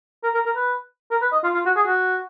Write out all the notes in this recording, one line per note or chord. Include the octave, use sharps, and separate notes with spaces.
A#4
A#4
A#4
B4
A#4
B4
D#5
F4
F4
F#4
G#4
F#4